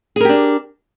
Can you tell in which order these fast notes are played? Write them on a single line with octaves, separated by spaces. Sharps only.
G#4 A#4 G4 D4